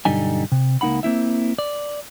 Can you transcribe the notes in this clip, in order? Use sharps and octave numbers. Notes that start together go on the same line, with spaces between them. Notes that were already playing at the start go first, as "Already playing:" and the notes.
B1 G2 D3 G3 D#4 G#5
C3
C#2 A#3 D#4 F#5 B5
A#3 C4 E4 E5
D5